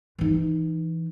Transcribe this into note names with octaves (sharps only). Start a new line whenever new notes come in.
E3 D#4